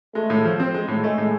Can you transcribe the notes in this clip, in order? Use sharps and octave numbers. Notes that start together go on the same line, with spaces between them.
G#3 A3
A2
F3
C4
G#3
A2
G#3 A3
A2